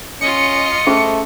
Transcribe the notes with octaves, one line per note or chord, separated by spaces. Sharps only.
C#4 F4 D#5 C#7
A3 C#4 G#4 C5